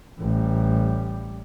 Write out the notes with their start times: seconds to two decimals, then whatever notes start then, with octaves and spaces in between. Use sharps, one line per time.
0.19 A1 G3